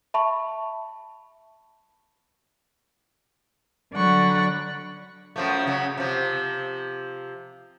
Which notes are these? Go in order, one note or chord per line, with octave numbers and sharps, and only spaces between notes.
E5 A5 B5 C#6
D3 F#3 D5 F#5 B5 C#6
F#2 F3 A3
C#3 F#3
C3 F3